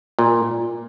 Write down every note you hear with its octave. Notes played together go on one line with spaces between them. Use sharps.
A#2